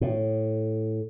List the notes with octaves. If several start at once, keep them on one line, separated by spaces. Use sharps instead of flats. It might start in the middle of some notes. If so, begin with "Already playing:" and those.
A2